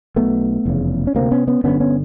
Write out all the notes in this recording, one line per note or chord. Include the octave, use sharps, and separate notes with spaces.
B1 B2 A3 B3
F1 E2 C#3
C#4
D2 C3 A#3 C4
B3 C#4
B3 C#4
G1 F#2 D3 B3 C#4
B3 C#4